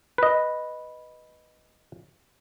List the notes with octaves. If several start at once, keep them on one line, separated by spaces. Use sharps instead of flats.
B4 D#5